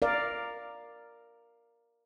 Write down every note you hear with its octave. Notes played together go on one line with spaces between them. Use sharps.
A#4 D5 F5